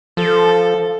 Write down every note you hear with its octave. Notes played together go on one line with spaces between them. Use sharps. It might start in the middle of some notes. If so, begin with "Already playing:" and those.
F3 A4